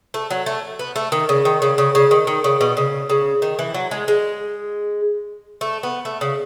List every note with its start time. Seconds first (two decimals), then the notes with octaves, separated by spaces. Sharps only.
0.14 A3
0.30 F#3
0.46 A3
0.79 B3
0.96 A3
1.12 D#3
1.29 C#3
1.45 D#3
1.62 C#3
1.78 C#3
1.95 C#3
2.11 D#3
2.27 D#3
2.44 C#3
2.61 B2
2.77 C#3
3.10 C#3
3.42 D#3
3.59 E3
3.74 F#3
3.91 G#3
4.08 G#3
5.61 A3
5.83 B3
6.05 A3
6.21 C#3